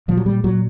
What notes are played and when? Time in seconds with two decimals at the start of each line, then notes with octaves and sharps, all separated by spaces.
0.08 A#2 F3
0.17 F#3
0.26 A#2 G3
0.44 A#2 F#3